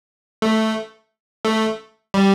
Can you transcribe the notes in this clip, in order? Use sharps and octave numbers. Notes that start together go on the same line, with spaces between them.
A3
A3
G3